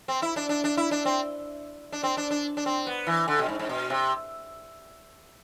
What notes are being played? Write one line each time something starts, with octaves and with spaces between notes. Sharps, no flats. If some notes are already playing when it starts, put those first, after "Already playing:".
C4
E4
D4
D4
D4
E4
D4
C4
D4
C4
D4
D4
D4
C4
B3
E3
D3
B2
G#2
G#2
B2
C3